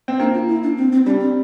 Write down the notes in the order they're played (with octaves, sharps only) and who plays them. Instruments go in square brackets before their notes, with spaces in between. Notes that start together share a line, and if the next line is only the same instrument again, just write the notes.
[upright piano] C4
[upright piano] A#3 [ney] D4
[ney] F4
E4
D4
C4
C4
[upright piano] G3 [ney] D4
[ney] C4